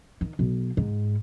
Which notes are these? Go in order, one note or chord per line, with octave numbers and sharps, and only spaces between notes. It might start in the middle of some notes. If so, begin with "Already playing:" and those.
D#3
B1
G#2